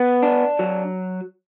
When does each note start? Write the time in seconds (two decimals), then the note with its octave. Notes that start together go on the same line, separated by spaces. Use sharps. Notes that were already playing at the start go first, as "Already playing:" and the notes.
Already playing: B3
0.22 D4
0.59 F#3